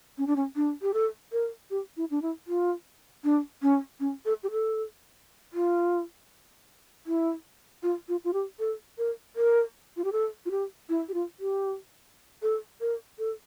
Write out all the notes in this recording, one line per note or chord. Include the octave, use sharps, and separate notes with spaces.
C#4
D4
C#4
D4
G4
A4
A#4
G4
E4
D4
E4
F4
D4
C#4
C#4
A4
G4
A4
F4
E4
F4
F4
F4
G4
A4
A#4
A#4
F4
G4
A4
F4
G4
E4
G4
F4
G4
A4
A#4
A4